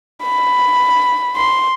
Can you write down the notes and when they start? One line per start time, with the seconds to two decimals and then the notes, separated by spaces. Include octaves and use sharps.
0.24 B5
1.36 C6